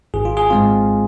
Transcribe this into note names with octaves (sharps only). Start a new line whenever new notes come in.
G#1 G#4
F4
G#4
G#2 G#3 C4 F4